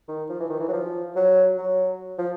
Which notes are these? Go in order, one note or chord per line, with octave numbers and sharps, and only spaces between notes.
D#3
F3
E3
D#3
E3
F#3
F3
F#3
F#3
F3